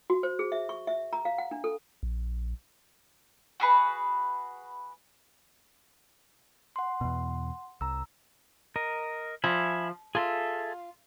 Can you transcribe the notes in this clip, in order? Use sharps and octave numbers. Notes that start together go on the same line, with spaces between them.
F#4
C5
G#4
E5
C#6
E5
A#5
F5
F#5
D4
A4
A#1
F#4 G#4 B4
F#5 C6
E2 B2
C2 A#5 E6
A#4 D#5
F3 E5 G#5 B5
F4 G#4 A4 E5